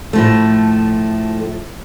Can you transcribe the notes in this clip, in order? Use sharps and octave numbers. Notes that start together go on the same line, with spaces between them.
A2 F3 A3